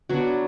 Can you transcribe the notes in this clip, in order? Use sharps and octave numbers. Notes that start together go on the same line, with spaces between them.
F#3 B3 D4 F#4